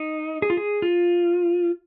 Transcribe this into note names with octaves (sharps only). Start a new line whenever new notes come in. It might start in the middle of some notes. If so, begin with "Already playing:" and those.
Already playing: D#4
G#4
F4
G#4
F4